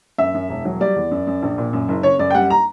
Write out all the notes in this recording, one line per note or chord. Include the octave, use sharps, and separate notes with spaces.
F#2 E5
F#2
E1
F#3
G3 D5
E2
F#2
F#2
A#1
A#2
F#2
F#1
C#3 C#5
F#2 D5
G5
G3 F#5
A#5